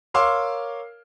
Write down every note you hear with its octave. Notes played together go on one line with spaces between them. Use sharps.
A#4 C#5 F5 C6 D6 E6